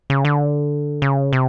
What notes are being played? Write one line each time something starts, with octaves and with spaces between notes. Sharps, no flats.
C#3
D3
C#3
C3